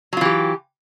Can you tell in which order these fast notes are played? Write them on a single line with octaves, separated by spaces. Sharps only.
F#3 F4 E3 G4